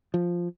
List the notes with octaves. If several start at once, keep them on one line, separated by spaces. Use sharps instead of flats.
F3